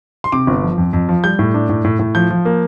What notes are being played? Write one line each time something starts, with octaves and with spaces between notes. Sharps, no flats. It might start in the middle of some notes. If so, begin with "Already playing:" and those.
C6
C3 D6
G1
F3
F2
F2
F3
G3 G6
A2
D4
A2
A2
A2
F3 G6
F3
A#3